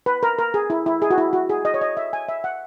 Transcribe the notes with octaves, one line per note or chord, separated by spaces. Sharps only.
B4
A#4
A#4
G#4
E4
E4
G#4
F#4
E4
F#4
G#4
D#5
C#5
D#5
E5
G#5
E5
F#5